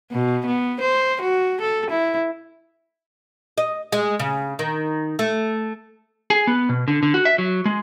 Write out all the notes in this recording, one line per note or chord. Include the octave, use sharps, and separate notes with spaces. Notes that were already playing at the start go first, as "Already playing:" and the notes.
B2
B3
C5
F#4
A4
E4
D#5
G#3
C#3
D#3
A3
G#4
B3
B2
D3
D3
F#4
E5
F#3
G#3